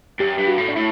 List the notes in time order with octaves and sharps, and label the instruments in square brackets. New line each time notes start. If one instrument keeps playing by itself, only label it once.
[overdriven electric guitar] F#2 [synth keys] G4
[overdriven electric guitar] G2
[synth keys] F#4
[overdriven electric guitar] A2
[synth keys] D4
[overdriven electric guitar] A2 [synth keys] E4